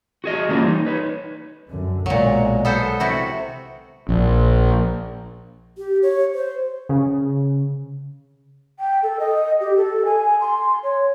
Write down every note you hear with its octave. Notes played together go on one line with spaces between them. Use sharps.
F#4 G#4 D#5
E3 G3 A#3 C#4 F4
D#4
B4 C#5
F#2 D3
B1 A#2 F#3 G#3
B3 A4 C5
C3 E4 F#4
A#1
G4
C#5
C5
C#3
G5
A4
D#5
G4
A4
G#5
C6
C#5